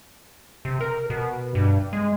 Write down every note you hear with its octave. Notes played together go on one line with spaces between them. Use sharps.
C3
A#4
B2
G2
G#3